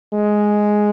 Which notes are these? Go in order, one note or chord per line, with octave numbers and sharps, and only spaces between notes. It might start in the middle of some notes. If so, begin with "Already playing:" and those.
G#3